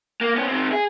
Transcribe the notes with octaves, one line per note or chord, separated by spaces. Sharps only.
A#3
B3 C#4
D#3 C4
G#4